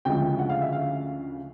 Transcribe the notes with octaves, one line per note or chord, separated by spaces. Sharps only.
D2 C#3 F3 G#3 G5
F#5
F5
E5
F5